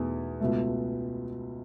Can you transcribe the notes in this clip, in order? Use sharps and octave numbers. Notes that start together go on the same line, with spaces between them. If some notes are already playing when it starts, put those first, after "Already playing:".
Already playing: E2 B2 A3 D#4 G#4
C#2 B2 A3